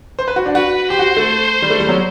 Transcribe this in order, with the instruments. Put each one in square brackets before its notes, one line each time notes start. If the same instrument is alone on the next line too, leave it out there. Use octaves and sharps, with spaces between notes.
[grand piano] C5
B4
F#4
D4
[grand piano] F#4 [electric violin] B4
[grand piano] G4 [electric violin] C5
[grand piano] F#4
A3
G3
A3
G3
F#3